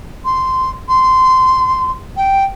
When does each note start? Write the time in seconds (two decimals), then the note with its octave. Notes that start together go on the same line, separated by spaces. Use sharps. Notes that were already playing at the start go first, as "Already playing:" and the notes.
0.25 C6
0.89 C6
2.17 G5